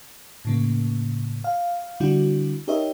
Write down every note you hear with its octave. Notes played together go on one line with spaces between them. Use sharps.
A2 C#3 A#3
F5
D3 G3 D4 E4 F#4
D#4 G4 A#4 C#5 D#5 E5